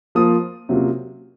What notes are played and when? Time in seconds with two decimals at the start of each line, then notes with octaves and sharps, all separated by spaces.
0.15 F3 A#3 F4 D#6
0.69 C3 F#3 A#3 C#4 F4